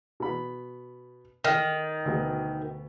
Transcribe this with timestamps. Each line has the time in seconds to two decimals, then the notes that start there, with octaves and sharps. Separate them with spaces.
0.20 B2 B5
1.44 D#3 F6
2.05 D2 B2